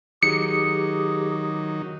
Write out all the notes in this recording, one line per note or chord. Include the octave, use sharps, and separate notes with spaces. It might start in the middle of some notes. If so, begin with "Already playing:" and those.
D#3 F#3 D#4 G4 G#4 C#7